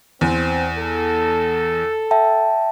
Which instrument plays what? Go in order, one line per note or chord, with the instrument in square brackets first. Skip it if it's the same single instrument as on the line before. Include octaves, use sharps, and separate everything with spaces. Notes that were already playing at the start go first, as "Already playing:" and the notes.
[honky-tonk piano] E2 [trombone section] C4
[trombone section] A4
[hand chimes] E5 G5 A5